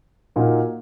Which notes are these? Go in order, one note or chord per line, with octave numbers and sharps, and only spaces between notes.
A#2 A#3 D#4 F#4